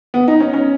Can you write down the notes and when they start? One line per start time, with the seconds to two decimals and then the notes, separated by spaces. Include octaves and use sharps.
0.14 B3
0.28 D#4
0.40 C#4
0.53 C#4